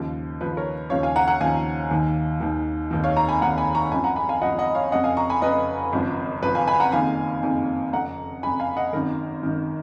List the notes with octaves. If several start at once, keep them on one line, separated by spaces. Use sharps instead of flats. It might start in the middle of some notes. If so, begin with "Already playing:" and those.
Already playing: D#2 C#3 F3
D#2 C#3 F3 B4
A#4 C#5
D#2 C#3 F3 C#5 F5
F5 G#5
F#5 A#5
F#5 A#5
D#2 C#3 F3 F5 G#5
D#2 D#3
D#2 D#3
F1 D#2 D#3
C#5 F5
A#5 C#6
G#5 B5
F1 D#2 D#3 F#5 A#5
G#5 B5
A#5 C#6
G#1 F#2 F3 G#5 B5
F#5 A#5
G#5 B5
F5 G#5
G#1 F#2 F3 D#5 F#5
D#5 F#5
C#5 F5
F1 F2 C#3 D#5 F#5
F5 G#5
A#5 C#6
G#5 B5
F1 F2 C#3 B4 D#5
G#1 F#2 C#3 F3
G#1 F#2 C#3 F3 B4
F5 G#5
G#5 B5
F#5 A#5
F#1 F2 D#3 F5 G#5
F#1 F2 D#3
F1 F2 C#3 F#5 A#5
F1 F2 C#3 G#5 B5
F5 G#5
D#5 F#5
G#1 F#2 D#3 A#4
G#1 F#2 D#3